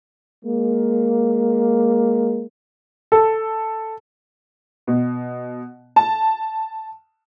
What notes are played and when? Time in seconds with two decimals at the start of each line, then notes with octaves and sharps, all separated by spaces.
0.44 G#3 A#3
3.12 A4
4.87 B2
5.96 A5